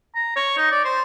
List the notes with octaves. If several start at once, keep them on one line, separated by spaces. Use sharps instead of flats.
A#5
C#5
D#4
D5
C5